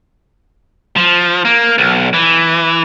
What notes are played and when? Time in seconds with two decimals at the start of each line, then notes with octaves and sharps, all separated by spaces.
0.97 F3
1.45 A#3
1.78 B1
2.14 E3